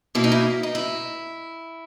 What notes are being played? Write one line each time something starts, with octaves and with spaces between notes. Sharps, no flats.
B2 A#3 E4
D#4
E4
D#4
E4